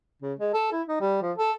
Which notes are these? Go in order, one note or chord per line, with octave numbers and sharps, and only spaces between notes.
C#3
G#3
A4
E4
D#4
G3
F3
A4